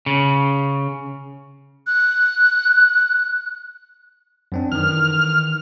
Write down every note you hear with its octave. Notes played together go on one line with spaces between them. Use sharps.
C#3
F#6
F#2 C4 D4
D#3 E3 F6